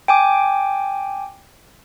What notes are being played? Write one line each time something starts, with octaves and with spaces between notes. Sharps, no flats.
G5 G#5 D6